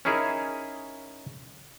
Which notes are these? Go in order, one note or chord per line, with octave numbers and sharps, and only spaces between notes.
C#4 D#4 E4 G#4 A#4